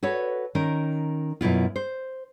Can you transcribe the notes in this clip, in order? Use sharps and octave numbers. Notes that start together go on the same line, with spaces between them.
F#4 A4 B4 C#5
D#3 C#4 A#4
F#2 B2 E4 F4
C5